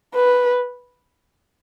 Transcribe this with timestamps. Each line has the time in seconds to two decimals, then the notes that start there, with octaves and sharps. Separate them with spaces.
0.15 B4